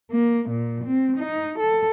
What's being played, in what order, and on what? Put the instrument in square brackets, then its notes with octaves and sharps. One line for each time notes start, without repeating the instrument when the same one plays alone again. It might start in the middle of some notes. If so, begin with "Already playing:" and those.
[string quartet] A#3
A#2
C4
D#4
A4